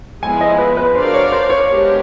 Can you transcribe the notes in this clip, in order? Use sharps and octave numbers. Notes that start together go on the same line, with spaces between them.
F3 G#3 B3 E4 G#5
D#5
B4
B4
D4 F#4 A#4 C5 D5 F5
C#5
C5
C#5
G#3 B3 D4 G4 A#4